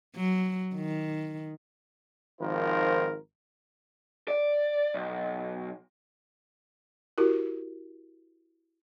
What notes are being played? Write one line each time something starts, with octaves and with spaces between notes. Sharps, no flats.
F#3
D#3
G#1 D#3 F3 F4 A#4 C5
D5
B1
E4 F#4 G4 A#4